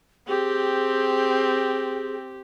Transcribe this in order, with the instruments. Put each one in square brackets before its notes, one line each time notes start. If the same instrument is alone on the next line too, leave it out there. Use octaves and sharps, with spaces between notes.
[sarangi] C4 [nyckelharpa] G4 [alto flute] G#4